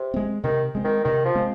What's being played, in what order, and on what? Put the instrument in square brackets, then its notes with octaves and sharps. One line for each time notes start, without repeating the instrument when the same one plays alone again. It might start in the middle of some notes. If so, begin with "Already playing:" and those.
Already playing: [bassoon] C3
[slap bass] G#3 C4
[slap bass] C3 [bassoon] D#3
[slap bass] G#3 C4
[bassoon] D#3
[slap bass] C3 [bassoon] D#3
[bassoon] F3
[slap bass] G#3 C4